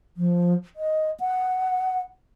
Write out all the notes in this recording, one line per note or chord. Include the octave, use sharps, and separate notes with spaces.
F3
D#5
F#5